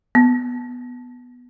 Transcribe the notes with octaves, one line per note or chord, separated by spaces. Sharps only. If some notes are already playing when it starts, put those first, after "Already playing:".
B3